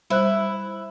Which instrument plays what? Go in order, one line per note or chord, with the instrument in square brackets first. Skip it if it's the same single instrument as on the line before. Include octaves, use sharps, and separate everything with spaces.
[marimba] G3 C5 F#6 [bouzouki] E4